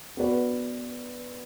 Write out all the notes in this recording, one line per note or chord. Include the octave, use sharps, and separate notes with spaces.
B3 F#4 B4 D5